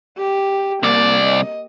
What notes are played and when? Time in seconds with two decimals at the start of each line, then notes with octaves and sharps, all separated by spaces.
0.18 G4
0.83 C2 A#3 D5
1.25 D#5